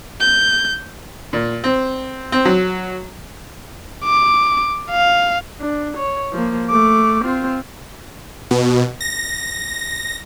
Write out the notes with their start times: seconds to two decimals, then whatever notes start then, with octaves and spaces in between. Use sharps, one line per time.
0.21 G6
1.33 A#2
1.64 C4
2.32 C4
2.45 F#3
4.05 D6
4.91 F5
5.61 D4
5.97 C#5
6.33 F3 A#3
6.69 A3 D6
7.24 C4 F4
8.51 B2
9.01 A#6